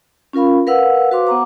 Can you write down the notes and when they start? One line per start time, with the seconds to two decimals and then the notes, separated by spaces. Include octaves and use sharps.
0.33 C#4 F4 A#4 F5 B5
0.67 A#4 B4 F5 F#5 E6
1.11 F#4 B4 C5 F5 C6 D6
1.27 B3 F#5 A#5 D6